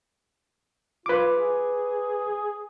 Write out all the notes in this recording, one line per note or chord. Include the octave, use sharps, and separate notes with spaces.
F4 B4 D6
G#4